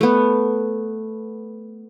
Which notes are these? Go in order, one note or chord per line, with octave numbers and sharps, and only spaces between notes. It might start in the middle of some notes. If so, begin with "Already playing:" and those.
A3 B3